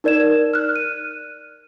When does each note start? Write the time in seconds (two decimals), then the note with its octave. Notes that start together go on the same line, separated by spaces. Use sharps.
0.04 D#4 A#4 D5 G#6 E7
0.54 F6 F#6
0.76 D#7